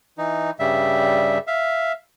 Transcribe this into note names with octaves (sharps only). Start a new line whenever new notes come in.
E3 D#4
G2 C#3 G3 E5
E5 F5